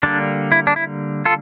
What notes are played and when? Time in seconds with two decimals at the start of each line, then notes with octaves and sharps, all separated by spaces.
0.03 D3 G3 A#3 D4
0.52 E4
0.67 D4
0.76 E4
1.25 F4 A4